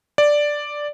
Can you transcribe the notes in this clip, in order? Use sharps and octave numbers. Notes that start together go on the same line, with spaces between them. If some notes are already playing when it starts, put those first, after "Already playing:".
D5